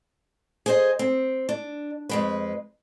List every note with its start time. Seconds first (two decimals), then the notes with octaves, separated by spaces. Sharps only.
0.66 G#4 C5 D#5
0.99 C4
1.49 D4
2.09 F2 G#3 B4